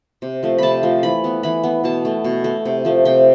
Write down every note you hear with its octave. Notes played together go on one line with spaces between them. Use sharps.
C3
F3 A3
C3 A5 B5
F3 A3
E3 B5
B3
E3 B5
B3
B2 A5
A3
B2
A3
C3
F3 A3
C3 G5